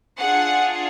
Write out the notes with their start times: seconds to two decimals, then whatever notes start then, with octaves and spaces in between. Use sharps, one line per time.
0.19 D4 F4 G#4 F#5